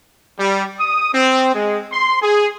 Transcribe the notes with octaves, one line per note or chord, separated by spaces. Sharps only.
G3
D#6
C4
G#3
C6
G#4